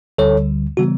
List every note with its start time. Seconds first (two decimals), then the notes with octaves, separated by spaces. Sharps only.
0.18 D2 D3 G3 A4 C#5
0.77 C#3 E3 G3 B3 F#4